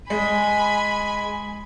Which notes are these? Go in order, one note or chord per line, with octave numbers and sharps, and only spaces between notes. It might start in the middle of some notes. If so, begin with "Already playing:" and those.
G#3 G#5 B5